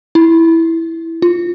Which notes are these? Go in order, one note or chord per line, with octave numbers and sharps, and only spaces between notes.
E4
F4